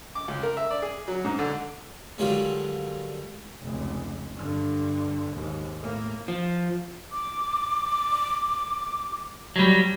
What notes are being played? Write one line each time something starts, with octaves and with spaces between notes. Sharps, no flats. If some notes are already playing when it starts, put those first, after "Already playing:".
D6
C#2
A#4
E5
D5
G#4
F#3
G#2
D3
G#2 D3 D#3 F#3 G3 F4
F1 C#2
G2 D3
D#2 G#2
A2 A#3
F3
D6
F#3 G3